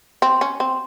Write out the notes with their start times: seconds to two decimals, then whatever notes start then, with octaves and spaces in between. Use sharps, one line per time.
0.22 C4
0.41 C#4
0.60 C4